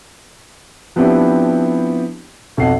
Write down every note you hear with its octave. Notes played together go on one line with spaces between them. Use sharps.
F3 B3 C4 D4 E4 G4
B1 F2 A4 D#5 F#5 C7